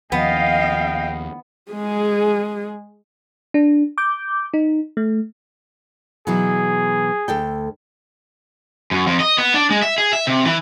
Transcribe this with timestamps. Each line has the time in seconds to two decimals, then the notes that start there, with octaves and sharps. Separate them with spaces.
0.12 D#2 F3 B3 D#5 F5 G5
1.72 G#3 G#4
3.54 D4
3.98 D6 G6
4.54 D#4
4.97 A3
6.27 B2 E3 F#3 G#4
7.28 D2 A4 G5
8.91 F#2
9.07 F2
9.20 D#5
9.38 B3
9.54 D4
9.70 G#3
9.83 E5
9.98 G#4
10.13 E5
10.27 C3
10.45 E3